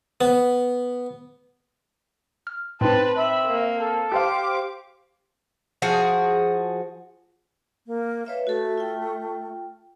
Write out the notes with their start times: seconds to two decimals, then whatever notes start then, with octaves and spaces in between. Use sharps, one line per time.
0.21 B3
2.47 F6
2.81 A2 C4 D#4 B4 A5
3.17 E5 B5
3.46 A#3
3.79 A4
4.12 G4 C5 F5 D6
5.82 F3 F#4 G#4
7.87 A#3
8.26 B4 C#5 E5 F5
8.47 A3 F#4 A4
8.78 F4 G5